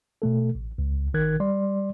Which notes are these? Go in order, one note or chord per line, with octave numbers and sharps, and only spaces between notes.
B2 A3 A4
A1
C#2
A1 D#3 A#4 F#6 G#6
G3 D5 C6